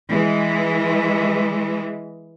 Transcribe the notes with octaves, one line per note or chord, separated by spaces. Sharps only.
E3 G#3